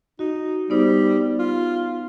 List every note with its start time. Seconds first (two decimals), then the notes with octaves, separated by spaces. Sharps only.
0.19 D#4 F#4
0.70 G3 B3 D#4 C5
1.39 F4